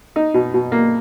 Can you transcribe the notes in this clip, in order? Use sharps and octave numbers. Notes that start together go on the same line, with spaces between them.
D#4
B2
B2
A#3